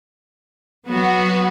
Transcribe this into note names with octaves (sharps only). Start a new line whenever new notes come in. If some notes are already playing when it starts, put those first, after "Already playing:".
F#3 B3 F#4